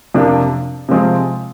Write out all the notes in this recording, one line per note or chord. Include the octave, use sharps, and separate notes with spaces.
F2 C3 F3 A#3 D4
C3 F3 G#3 C4 F4